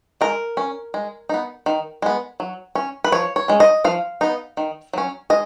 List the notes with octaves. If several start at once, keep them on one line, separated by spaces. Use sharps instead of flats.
G#3 A#4
C#4
G#3
B3 D#4
D#3
G#3 B3
F#3
C#4
B4
F3 C#5
C#5
G#3 C#4
D#5
F3 F5
B3 D#4
D#3
F#3 C#4
G#3 D#5